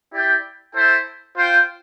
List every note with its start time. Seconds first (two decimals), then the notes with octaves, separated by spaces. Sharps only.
0.13 E4 G4 D5 G5
0.75 E4 A4 C5 G5
1.37 F4 C5 G5